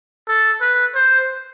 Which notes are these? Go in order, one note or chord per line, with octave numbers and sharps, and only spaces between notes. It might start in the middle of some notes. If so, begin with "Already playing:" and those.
A4
B4
C5